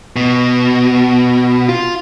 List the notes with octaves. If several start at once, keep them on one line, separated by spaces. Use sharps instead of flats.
B2
F4